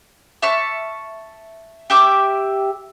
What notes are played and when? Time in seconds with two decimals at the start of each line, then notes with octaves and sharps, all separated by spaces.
0.42 E5 A5 C#6 F6
1.90 G4 E5 D6